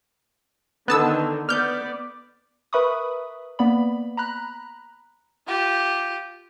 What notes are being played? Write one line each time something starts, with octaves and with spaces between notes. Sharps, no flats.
D3 D#3 B3 A5 E6
B3 D5 F6 G6
A#4 B4 E5 B5 C#6 D#6
A#3 B3 D5 B5
A#5 B5 F#6
F4 G4